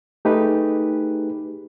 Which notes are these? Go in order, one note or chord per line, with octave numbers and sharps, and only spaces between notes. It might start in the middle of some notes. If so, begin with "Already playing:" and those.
A3 D#4 G4 G#4 B4